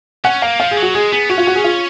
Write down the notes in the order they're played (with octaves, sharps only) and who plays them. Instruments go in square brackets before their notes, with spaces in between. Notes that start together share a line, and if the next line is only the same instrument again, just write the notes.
[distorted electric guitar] C#4 [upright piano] F#5
[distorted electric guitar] A#3 [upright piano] F5
[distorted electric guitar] F3 [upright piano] F5
[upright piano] G#4
[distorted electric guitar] F#3
[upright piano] F#4
[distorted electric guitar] G#3 [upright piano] G#4
[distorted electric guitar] B3 [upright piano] G#4
[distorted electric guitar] C#4 [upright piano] F#4
[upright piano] F4
F#4
G#4
F4